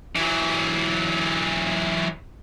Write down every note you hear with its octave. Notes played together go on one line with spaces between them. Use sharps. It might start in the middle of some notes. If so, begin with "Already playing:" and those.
E3 F#3